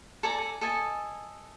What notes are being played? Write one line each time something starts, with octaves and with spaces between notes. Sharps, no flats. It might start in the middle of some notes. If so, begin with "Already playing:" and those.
A4 D5 G#5 A#5
G#5
A4 D#5 G#5 A5